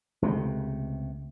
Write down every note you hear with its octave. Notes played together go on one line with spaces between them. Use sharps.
C#2 C3 E3 A3